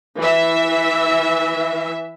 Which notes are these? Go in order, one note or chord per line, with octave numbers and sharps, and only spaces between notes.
E3 E5